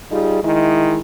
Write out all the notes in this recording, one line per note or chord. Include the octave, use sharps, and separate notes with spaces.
G3 D#4 F4 G#4
D#3 G#3 E4